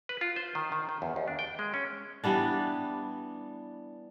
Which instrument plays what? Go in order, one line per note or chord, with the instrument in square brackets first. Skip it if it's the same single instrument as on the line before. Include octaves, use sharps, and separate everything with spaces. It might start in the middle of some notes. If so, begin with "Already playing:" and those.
[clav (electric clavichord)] B4
F4
C5
D#3
D#3
D#3
E2
D#2
D4
G5
G#3
C#4
[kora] E3 G3 B3 D4